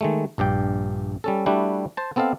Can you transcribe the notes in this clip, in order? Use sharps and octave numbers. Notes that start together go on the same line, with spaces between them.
D#3 G#3 A3
A#1 G2 D5 G5
G3 C#4 A4
G3 A3 D4 E4 F#4 G4
C5 A5
B3 C4 A4 D#5 F5